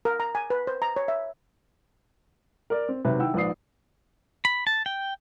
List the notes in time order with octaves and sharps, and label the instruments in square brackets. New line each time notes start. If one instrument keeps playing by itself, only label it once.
[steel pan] A#4
A#5
G#5
B4
C5
A#5
C#5
E5
[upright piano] A#4 D5
C4
C3 D#3 F#3 B4 E5
D#3 E4 F#5 G5 E6
A#1 G#2 B4 D5 D#6 C7
[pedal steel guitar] B5
A5
G5